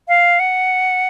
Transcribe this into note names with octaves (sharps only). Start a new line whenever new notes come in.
F5
F#5